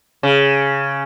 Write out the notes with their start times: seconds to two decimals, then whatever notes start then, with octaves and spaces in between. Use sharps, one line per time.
0.23 C#3